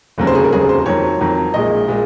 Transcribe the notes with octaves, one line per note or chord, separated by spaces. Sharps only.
F1 D#2 C#3 F#3
C5
G#4
A#4
F1 D#2 C#3 F#3 G#4
C5
F2 D#3 F#3 C#5
F2 D#3 F#3
A#1 A#2 G#3 D#5
A#2 G#3